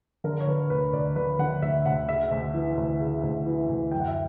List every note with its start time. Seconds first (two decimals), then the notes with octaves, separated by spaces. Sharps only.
0.24 D3 A#4
0.41 C#5
0.47 D3 B4
0.70 D2 B4
0.93 D2 D5
1.16 D3 B4
1.39 D3 F#5
1.62 D2 E5
1.86 D2 F#5
2.08 C#3 E5
2.31 D2
2.54 E3
2.77 D2
3.00 C#3
3.23 D2
3.46 E3
3.69 D2
3.92 F#2 G5
4.00 F#5
4.08 E5